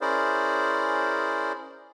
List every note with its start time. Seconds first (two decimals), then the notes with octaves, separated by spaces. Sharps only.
0.01 C#4 E4 G#4 A#4 C5 D5